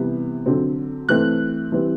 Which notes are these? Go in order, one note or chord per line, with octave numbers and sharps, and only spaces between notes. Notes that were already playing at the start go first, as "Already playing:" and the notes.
Already playing: C3 E3 G3 B3
D3 F#3 C4
E3 A3 C4 F#6
E3 G3 C4